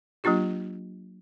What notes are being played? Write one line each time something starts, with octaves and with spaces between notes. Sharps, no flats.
F#3 A#3 D4 F4 G4